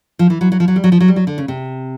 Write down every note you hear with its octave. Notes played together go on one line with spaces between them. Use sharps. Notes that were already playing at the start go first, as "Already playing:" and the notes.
F3
E3
F#3
F#3
F3
F#3
G3
F#3
F3
F#3
G3
F#3
D3
C#3
C3